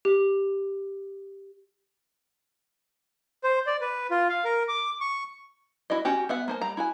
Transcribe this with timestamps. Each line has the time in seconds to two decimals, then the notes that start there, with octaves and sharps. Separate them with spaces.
0.05 G4
3.44 C5
3.67 D5
3.81 B4
4.11 F4
4.29 F5
4.45 A#4
4.68 D6
5.01 C#6
5.90 E4 F#4 D5 D#5
6.05 C#4 F#4 G4
6.29 B3 E5 F#5
6.48 A#3 C5 A5
6.61 G3 A#5
6.77 E4 F#4 G#5